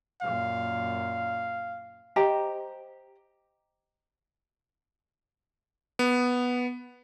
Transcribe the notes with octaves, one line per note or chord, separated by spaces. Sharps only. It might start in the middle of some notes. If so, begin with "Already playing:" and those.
F#2 A#2 F5
G4 C5 D#5 A#5
B3